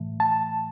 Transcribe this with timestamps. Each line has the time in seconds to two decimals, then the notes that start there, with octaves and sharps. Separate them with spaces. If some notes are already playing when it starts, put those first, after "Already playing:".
Already playing: A2 E3 A3
0.20 A5